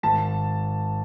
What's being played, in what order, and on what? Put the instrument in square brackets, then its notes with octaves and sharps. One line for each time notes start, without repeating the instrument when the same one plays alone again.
[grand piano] G#1 A5